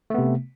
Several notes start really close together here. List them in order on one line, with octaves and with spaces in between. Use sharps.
A3 B3 C3